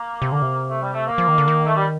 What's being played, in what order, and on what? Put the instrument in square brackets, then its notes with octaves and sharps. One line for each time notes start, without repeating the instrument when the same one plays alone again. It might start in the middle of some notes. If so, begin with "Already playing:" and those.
Already playing: [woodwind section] A#3
[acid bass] C3
D3
C3
[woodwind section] A3
G3
A3
A#3
[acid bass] F3
D#3
D3
D#3
[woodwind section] A3
G3